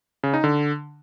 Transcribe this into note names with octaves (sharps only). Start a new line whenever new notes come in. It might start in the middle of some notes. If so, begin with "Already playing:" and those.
C#3
D#4
D3